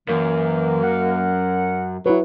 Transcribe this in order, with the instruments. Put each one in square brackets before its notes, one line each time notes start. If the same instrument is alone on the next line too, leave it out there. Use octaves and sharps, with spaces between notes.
[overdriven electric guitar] F#2 [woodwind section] E3 [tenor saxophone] A#3
[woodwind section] A#4 F#5
[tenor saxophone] F#3 [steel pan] E4 B4